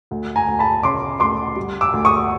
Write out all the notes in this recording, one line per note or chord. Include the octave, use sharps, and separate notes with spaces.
D2
G#5 A#5
D2
A5 B5
C#3 C6 D6
D2 C6 D6
G3
D6 E6
D2
C#6 D#6